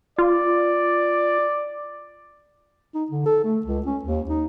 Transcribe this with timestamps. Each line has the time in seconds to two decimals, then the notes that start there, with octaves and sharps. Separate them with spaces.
0.18 F4 D5
2.94 D#4
3.11 D3
3.26 A4
3.44 A3
3.66 C#2
3.86 C#4
4.03 D#2
4.29 D#4